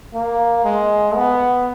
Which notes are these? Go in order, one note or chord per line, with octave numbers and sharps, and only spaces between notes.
A#3
G#3
B3